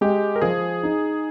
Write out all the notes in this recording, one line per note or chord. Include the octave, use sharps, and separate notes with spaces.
G#3 G4
A#4
F3 G#4
D#4